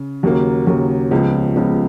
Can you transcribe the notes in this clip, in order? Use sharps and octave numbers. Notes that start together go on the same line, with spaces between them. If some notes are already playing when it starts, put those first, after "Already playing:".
Already playing: C#3
D#2 C#3 F#3 A#3
D#2 C#3 F#3 A#3
C#2 C#3 F3 B3
C#2 C#3 F3 B3